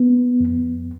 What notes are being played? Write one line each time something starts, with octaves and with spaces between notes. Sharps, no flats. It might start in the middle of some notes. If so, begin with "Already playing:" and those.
Already playing: B3
F2